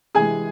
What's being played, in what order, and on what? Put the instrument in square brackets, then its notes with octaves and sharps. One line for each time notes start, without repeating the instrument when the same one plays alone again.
[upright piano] C3 E3 G#3 G#4 G#5